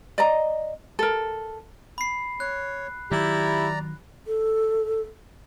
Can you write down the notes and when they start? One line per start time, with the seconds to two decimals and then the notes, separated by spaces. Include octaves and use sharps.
0.18 D5 D#5 A#5
0.99 A4 A#4
1.98 B5 C7
2.40 C#5 F#6
3.11 D#3 F#3 E4 G4 D5 A#5
4.27 A4